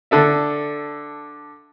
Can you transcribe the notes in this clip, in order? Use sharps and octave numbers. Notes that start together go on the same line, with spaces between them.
D3 A4 E5